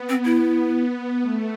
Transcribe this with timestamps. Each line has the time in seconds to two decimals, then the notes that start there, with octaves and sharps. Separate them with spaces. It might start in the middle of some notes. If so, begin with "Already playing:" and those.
Already playing: B3
0.09 C4
0.25 E4
1.22 A3